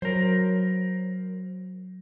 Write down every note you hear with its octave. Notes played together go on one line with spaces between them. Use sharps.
F#3 A#4 C5